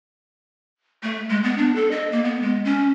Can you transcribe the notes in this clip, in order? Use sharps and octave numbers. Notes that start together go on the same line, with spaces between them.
A3
G#3
B3
D4
A4
D#5
A#3
B3
G#3
C#4